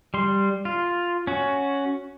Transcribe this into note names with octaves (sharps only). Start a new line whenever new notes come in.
G3 C6
F4
C#4 F#4